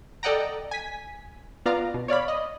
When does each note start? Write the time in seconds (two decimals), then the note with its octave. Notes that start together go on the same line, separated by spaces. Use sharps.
0.23 A4 D5 D#5 F#5 G5 A#5
0.71 G#5 B6
1.66 B3 F4 D5 F5 A#5
1.94 B2
2.08 C#5 D5 F5 B5
2.28 D#5